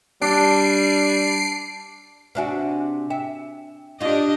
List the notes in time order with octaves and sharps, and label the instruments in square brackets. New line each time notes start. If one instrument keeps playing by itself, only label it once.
[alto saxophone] G3 [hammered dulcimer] D4 [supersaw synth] C7 D7
[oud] C3 D4 F#4 [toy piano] B4 E5 G#5
[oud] E5 [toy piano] G5
[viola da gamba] D4 G4 D#5 [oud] D#4 F4